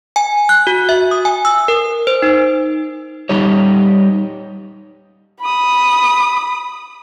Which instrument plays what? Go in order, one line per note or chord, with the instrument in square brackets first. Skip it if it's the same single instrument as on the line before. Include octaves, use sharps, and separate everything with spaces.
[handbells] G#5
F#6
F#4
E5
D#6
G#5
E6
A#4
C5
D#4
[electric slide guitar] G3 D#4 G4 C#5
[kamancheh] B5 D#6